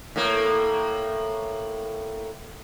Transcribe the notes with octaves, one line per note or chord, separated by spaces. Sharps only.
A2 A#3